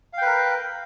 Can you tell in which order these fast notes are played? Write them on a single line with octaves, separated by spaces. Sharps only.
F5 G5 B4 A#4